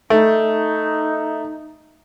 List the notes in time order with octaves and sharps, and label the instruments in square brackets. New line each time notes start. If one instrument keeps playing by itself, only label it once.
[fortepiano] A3 [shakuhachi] D#4